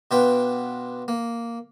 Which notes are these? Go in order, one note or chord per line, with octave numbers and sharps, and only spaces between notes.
B2 D4 F4 B4 G5
A#3